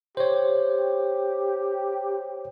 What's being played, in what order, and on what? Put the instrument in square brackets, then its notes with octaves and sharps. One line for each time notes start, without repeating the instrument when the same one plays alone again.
[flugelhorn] G4 [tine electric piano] C5 C#5